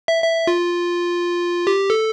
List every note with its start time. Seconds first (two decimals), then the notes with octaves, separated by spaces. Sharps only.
0.08 E5
0.24 E5
0.47 F4
1.67 G4
1.90 A4